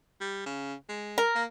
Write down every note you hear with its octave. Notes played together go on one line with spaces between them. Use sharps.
G3
C#3
G#3
A#4
A#3